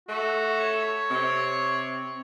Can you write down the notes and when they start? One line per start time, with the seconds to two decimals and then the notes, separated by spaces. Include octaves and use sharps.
0.09 A3 F#4
0.60 C#5
1.10 C3 C4